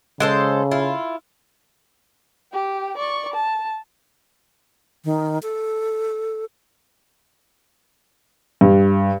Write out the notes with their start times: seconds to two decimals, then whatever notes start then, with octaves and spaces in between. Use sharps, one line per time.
0.20 C#3 G#3 A4 C5
0.71 E4 F4
2.52 G4 G5
2.97 D5 C#6
3.33 A5
5.05 D#3
5.43 A4
8.61 G2